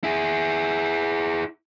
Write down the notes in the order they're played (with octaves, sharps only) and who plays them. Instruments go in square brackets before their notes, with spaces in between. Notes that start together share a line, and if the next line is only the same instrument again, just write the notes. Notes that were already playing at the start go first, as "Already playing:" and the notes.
[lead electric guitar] E4 G#4